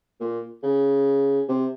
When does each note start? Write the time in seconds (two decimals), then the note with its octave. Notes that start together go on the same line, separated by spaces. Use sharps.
0.21 A#2
0.63 C#3
1.49 C3